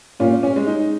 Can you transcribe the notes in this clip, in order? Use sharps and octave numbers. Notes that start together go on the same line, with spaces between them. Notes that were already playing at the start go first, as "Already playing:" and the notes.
A#2 C#4 F4
C#4
G#3
D#4